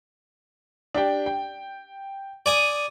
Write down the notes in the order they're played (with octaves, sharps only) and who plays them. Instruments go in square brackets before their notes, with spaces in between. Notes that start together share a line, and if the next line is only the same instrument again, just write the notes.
[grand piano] D4 G4 G5
G5
[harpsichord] D5 G#5 D#6